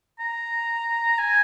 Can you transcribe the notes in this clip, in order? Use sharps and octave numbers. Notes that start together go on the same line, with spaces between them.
A#5
G#5